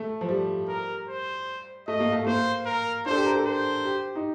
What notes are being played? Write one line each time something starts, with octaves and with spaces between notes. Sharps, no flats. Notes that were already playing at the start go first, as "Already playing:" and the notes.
Already playing: A3
F3
G3
A#4
C5
A3 D#5
A#3
A3
A#3 C5
A#4
D4 A4 C5
G4
A#4
A4
C5
G4
D#4